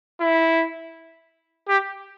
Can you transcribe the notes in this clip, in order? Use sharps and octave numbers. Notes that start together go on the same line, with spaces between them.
E4
G4